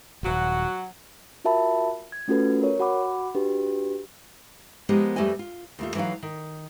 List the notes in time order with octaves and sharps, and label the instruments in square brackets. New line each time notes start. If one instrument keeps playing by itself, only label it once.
[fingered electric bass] D#1 G#1 [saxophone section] F#3 F#4
[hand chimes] F4 F#4 A#4 E5 A5 B5
G#6
A3 C#4 F4 F#4 A4 B4
A#4 C#5
F#4 F#5 B5 D6
D4 F#4 G4 B4
[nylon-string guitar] F3 G#3 B3 D#4 G4 A#4
F2 G3 A3 B4 D#5 G#5
F4
D#2 A3 F4
E3 F#3 D#4 B4 F5
D#3